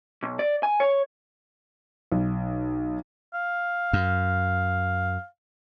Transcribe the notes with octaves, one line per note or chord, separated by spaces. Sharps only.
B1
D5
G#5
C#5
B1
F5
F#2